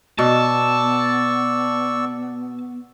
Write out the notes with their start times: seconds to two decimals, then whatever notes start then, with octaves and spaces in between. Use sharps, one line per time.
0.19 B2 B3 D5 A5 C#6 E6